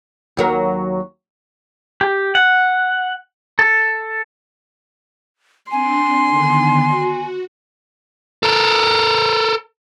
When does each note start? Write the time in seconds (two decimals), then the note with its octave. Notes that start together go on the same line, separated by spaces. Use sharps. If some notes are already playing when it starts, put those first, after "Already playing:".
0.37 D#2 F#3 A#4
2.01 G4
2.35 F#5
3.59 A4
5.71 C4 D4 G#5 C6
6.26 D3 D#3 B3
6.82 F#4
8.43 A4 A#4